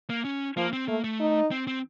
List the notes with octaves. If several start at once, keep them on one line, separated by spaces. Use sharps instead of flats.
A#3
C#4
F3 A#3
C4
A3 A#3
A3
D#4
C4
C4